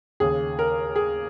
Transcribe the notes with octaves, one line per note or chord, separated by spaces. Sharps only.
D#2 C#3 G#4
A#4
G#4